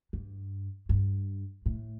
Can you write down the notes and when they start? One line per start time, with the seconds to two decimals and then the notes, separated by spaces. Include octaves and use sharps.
0.13 G2
0.89 G2
1.66 A2